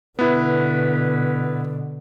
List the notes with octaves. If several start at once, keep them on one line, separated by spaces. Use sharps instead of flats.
B2 D3 B3 E4 B4